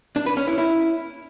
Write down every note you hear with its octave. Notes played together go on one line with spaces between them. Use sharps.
D4
B4
C#4
E4
E4